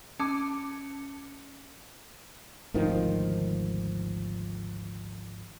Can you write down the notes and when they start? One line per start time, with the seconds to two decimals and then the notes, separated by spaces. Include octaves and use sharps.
0.20 C#4 A5 D6
2.74 G#1 D2 D#3 F3